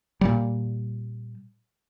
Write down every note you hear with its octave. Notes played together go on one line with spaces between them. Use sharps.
A#2 G3